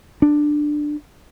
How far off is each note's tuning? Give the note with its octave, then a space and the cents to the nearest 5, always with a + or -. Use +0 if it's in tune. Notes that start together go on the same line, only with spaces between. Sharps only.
D4 +15